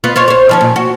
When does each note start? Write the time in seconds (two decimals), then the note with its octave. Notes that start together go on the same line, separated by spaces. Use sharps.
0.04 B3 F4
0.16 F4 C5 C#5
0.28 C5 C#5
0.49 D#3 F3 C#4
0.61 A#2
0.76 F#4